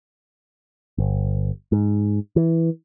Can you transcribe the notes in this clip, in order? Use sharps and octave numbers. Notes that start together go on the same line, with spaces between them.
G1
G#2
E3